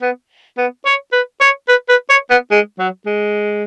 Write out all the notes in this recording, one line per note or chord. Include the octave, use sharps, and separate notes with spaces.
B3
B3
C#5
B4
C#5
B4
B4
C#5
B3
G#3
F#3
G#3